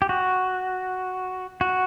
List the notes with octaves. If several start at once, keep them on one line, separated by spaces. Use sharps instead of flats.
G4
F#4
F#4